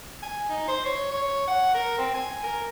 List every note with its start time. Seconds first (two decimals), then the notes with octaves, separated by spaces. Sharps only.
0.22 G#5
0.49 D#4
0.68 C5
0.85 C#5
1.11 C#5
1.47 F#5
1.74 A#4
1.98 C4
2.14 G#5
2.43 A#4